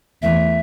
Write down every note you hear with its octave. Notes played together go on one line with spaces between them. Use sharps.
E2 E3 A3 E5